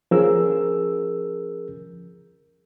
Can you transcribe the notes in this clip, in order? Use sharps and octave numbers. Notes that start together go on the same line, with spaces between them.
F3 C#4 G#4 A#4 E6